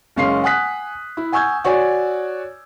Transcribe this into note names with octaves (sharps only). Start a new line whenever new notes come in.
F#1 G#3 C#4 F5 C6 C7
F#5 G#5 D#6 F#6 B6
E4
F#5 G#5 C#6 E6 G6 G#6
F#4 C#5 D5 G#5